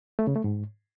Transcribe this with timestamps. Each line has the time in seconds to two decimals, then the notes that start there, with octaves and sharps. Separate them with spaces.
0.19 A3
0.27 C#3
0.36 A3
0.44 G#2